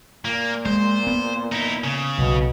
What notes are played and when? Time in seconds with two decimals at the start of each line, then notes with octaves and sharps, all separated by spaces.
0.25 A#2 A#3
0.66 G#3 C5
1.07 B3
1.52 D#4 E4
1.84 C#3
2.18 B1 B2